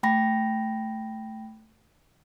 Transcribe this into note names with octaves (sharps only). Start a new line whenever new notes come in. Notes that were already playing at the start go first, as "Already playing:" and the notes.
A3 G5 B5 A#6